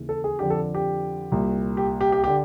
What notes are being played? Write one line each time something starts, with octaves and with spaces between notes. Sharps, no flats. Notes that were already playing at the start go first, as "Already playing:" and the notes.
Already playing: D#2 C#3 E3
A4
G#4
F2 D3 G4
A4
G4
C2 A#2
G4
G4
G4
D3 G4